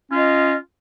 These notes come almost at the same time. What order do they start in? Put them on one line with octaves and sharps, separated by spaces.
C#4 F4 D#5